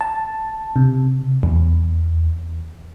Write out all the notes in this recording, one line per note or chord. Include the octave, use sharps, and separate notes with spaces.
A5
C3
E2